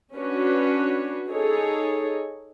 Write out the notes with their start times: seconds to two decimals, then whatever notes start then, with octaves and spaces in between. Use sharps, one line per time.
0.15 C#4 D4 F#4 B4 C#5
1.30 D#4 G#4 A4 C#5